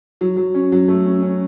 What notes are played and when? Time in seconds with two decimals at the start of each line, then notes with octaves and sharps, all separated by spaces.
0.21 F#3
0.37 F#3
0.54 C#4
0.72 F#3
0.88 A3
1.06 C#4
1.22 C#4